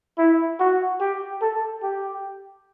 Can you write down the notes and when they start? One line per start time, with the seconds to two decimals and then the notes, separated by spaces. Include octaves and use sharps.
0.18 E4
0.60 F#4
1.00 G4
1.42 A4
1.83 G4